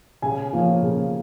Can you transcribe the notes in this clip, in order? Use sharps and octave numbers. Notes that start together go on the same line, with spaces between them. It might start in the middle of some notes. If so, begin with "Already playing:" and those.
C#3 G#5
F3 A#3 C#4
C#3